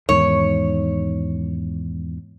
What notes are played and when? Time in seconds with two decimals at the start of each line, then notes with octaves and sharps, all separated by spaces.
0.09 E2 G#2 D#3 C#5